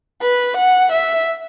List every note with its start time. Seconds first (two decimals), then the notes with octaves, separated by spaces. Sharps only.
0.22 B4
0.57 F#5
0.92 E5